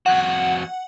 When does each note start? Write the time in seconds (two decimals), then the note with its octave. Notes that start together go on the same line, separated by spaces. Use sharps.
0.06 F2 F#4 F#5